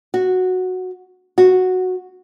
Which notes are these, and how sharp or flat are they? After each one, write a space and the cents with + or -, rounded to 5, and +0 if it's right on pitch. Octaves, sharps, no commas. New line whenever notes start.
F#4 -5
F#4 -5